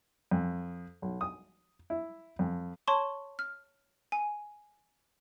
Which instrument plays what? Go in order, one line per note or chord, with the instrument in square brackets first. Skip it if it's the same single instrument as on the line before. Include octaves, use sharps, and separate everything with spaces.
[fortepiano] F2
B1
D#6
E4
F2
[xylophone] C#5 A5 C6 C#6
F6
G#5